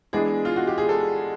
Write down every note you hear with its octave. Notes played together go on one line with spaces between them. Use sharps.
E3 G#3 B3 D4 G#4
F4
F#4
G4
G#4
A4